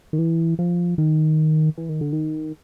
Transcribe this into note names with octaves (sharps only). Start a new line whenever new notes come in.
D#3
E3
F3
D#3
E3
D#3
D3
D#3